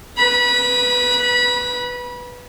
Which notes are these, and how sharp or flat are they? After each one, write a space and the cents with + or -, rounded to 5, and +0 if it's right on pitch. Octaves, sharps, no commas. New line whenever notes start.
B4 +0 B5 -30